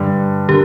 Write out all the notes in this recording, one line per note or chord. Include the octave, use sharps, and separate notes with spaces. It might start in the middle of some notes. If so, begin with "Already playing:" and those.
Already playing: G2 D3 G3
D3 A#3 G4